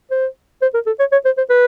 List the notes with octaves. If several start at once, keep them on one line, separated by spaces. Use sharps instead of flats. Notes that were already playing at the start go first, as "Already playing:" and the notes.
C5
C5
A#4
A4
C#5
C#5
C5
C5
B4